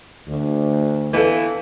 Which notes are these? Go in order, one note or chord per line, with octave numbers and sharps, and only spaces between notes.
D2
E3 B3 A4 B4 F5